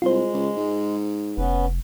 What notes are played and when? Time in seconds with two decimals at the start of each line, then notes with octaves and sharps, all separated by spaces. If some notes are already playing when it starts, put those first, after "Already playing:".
0.02 C2 G#3 F4 C5
0.33 C#2
0.56 G#2
1.37 F1 B3 C#4 B4